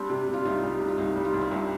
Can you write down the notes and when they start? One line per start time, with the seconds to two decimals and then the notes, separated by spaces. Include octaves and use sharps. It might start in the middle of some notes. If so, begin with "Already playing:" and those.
Already playing: G3 C4 D4
0.09 C3
0.28 G3
0.34 F4
0.45 C2 D#4
0.63 G3
0.81 C3
0.88 F4
0.98 C2 D#4
1.16 G3
1.25 F4
1.34 C2
1.41 C4
1.51 C2 D4